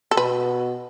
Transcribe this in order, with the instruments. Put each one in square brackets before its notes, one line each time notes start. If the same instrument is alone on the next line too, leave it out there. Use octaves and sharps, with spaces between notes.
[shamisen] A4
[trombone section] B2 [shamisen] B4